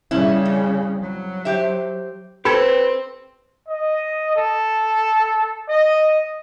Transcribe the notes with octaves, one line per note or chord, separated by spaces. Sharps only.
C#3 G3 C#4 E4
F2
F#3
G4 C5 E5
C4 G4 A4 B4 B5 E6 G#6
D#5
A4
D#5